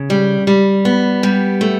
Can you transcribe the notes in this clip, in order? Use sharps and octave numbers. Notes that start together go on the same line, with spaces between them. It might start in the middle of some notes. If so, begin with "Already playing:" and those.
Already playing: C#3
G3
G3
B3
G3
A3